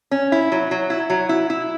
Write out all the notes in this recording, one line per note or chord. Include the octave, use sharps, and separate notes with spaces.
C#4
E4
F#3
F#3
E4
F#3
E4
E4